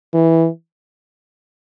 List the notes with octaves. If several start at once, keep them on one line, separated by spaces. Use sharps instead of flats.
E3